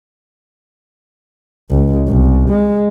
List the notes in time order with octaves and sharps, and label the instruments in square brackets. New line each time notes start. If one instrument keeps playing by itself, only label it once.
[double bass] C#2
C2
G#3